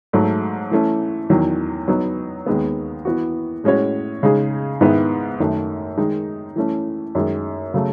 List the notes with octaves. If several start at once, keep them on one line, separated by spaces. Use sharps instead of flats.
G#2 F#3 A3
E3 A3 C#4
E2 D#3 F#3
F#3 B3 D#4
D#2 D#3 G#3 B3
E3 B3 F#4
A2 G#3 C#4 F#4 C#5
C#3 G#3 D#4 G#4
G#2 D#3 G#3 B3 E4
F#2 D#3 A3
D#3 G#3 D#4
E3 A3 C#4
F#2 D#3 G#3
C#3 F#3 A3